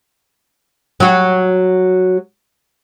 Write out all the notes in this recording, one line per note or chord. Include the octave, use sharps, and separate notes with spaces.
F#3 F#4